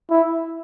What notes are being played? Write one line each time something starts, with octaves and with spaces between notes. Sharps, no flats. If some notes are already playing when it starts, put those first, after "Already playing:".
E4